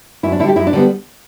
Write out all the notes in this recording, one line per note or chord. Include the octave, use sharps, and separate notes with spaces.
F#2 E4
D4
D3 G3 E4 G4
F#2 E4
D4
D3 G3 B3